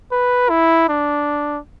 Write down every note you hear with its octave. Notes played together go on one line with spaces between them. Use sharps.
B4
E4
D4